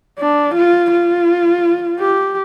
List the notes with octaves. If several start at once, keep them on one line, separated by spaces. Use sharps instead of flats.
D4
F4
F4
G4